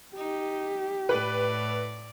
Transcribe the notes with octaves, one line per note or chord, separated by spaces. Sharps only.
D#4 G4
A2 B4 D5